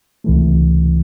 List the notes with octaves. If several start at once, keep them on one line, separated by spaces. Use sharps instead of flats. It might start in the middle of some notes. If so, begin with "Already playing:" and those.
C#2 C3 E3 A3